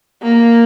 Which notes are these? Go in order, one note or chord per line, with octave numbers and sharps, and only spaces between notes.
A#3